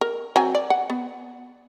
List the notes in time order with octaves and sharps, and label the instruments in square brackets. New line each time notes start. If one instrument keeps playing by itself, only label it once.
[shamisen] A#4
F#3 C4 G#5
D5
F#5
B3